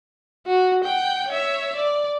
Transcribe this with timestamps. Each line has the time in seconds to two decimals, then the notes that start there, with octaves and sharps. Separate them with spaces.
0.47 F#4
0.84 F#5 G5
1.28 C#5 E5
1.76 D5